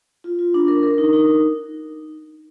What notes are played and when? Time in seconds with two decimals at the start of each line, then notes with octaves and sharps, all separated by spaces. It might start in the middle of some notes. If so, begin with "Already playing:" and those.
0.24 F4
0.39 F4
0.54 D4
0.68 A#4
0.83 A#4
0.98 D#4
1.13 D#4